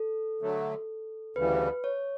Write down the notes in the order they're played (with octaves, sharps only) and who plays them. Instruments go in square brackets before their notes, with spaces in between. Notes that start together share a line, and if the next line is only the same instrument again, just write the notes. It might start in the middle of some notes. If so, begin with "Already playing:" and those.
Already playing: [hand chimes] A4
[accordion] D3 F#3 A3
[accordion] D2 C#3 E3 G3 [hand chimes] B4
[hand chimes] C#5